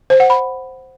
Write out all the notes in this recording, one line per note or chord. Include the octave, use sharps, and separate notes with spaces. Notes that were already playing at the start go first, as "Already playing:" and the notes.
C5
F#5
B5